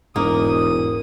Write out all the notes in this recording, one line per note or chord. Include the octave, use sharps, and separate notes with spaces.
E1 G#2 A#3 D#6